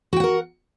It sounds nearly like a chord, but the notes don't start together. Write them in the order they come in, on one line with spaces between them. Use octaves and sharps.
F#4 G5 F#5 A#4